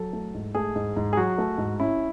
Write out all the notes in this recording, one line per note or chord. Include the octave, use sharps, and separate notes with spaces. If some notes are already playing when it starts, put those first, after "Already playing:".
Already playing: F#3 A4
A3
G#2
A3 G#4
G#2
G#2
G#4
F#3 F#4
A3
G#2
C#4 E4